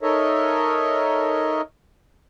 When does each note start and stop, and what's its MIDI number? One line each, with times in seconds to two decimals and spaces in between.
0.02 1.61 63
0.02 1.61 69
0.02 1.61 70
0.02 1.61 73
0.02 1.61 75
0.02 1.61 76